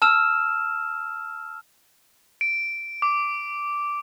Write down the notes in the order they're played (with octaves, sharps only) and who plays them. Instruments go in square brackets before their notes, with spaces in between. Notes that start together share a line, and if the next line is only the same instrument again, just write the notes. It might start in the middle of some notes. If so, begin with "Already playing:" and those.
[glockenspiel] A5 E6 F6 E7
[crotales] D7
D6